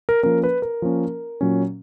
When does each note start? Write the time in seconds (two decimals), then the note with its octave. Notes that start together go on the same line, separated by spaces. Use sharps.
0.09 A#4
0.23 F3 A#3 C#4 A#4
0.44 B4
0.62 A#4
0.82 F3 A#3 C#4
1.41 A#2 F#3 C#4